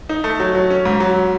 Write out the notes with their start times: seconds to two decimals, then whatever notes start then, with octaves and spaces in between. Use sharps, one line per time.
0.09 D#4
0.24 A3
0.40 F#3
0.55 F#3
0.70 C#4
0.85 G#2
1.00 F#3